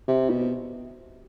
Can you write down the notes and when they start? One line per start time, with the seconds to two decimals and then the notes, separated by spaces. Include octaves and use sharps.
0.08 C3
0.30 B2